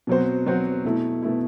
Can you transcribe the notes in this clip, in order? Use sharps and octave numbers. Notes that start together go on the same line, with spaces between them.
B2 F#3 C4 F#4 C5
B2 F#3 C4 F#4 C5
B2 A3 E4
B2 A3 E4